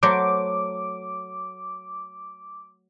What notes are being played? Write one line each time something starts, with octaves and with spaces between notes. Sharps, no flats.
F#3 A3 C5 D6